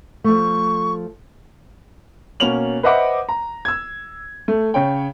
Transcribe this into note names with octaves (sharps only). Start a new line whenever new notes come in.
F3 A3 C#6
B2 A#3 C#4 F7 F#7
B4 C5 D#5 E5 F#5 D6
A#5
E6 G#6
A3
C#3 C#5 G5